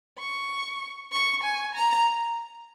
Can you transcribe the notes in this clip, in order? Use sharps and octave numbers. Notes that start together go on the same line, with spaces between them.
C#6
C#6
G#5
A#5